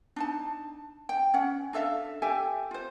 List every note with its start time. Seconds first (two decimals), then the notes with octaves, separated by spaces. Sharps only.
0.16 D4 D#4 A5
1.09 G5
1.34 C#4 F#5
1.73 D4 A4 E5 F5
2.22 G4 A4 E5 G#5
2.71 F4 C5